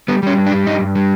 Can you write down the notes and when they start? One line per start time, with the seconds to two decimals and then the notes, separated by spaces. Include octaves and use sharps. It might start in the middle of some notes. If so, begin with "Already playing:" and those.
0.08 G3 B3
0.23 G3 C#4
0.38 G2
0.46 D4
0.52 G3
0.66 G2 D#4
0.81 G2
0.95 G3